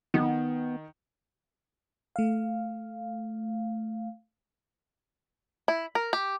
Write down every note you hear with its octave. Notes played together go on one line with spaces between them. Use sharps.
D#3 B3
A3 F5
E4
A#4
G4